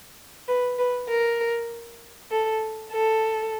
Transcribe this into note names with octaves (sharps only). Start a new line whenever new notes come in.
B4
B4
A#4
A4
A4